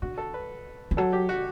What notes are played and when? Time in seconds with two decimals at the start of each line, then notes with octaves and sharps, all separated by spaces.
0.02 D3 F#4
0.18 A4
0.34 B4
0.91 E3
0.97 F#3 A4
1.13 G4
1.29 F#4